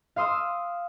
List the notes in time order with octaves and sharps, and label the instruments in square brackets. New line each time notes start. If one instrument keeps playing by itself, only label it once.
[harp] F5 C6 D#6 E6